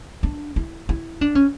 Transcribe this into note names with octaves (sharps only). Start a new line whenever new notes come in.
D4
E4
E4
D4
C#4